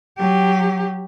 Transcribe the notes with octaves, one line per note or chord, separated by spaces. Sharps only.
F#3 G4